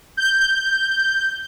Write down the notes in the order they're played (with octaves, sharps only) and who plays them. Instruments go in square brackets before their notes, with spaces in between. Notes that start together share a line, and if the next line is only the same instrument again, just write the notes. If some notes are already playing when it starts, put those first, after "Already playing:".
[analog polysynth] G6